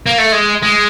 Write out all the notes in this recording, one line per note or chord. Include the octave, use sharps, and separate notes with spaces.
A#3
A3
G#3
G#3